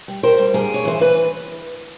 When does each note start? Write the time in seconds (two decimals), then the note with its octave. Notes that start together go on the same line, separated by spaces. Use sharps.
0.08 G3
0.23 G3 A#4 C5
0.38 G3
0.54 G2 G#4 A#4
0.69 G2
0.74 C#5
0.85 E3 C5
0.99 E3 B4